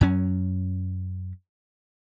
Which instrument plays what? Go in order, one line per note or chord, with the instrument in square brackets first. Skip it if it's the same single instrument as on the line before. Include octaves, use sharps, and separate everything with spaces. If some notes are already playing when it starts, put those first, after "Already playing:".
[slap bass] F#2 F#3 C#4